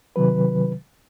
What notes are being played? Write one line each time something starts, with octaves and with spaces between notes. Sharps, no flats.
C3 D#3 F#3 B4